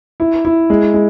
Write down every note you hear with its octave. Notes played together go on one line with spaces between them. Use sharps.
E4
E4
G#3
G#3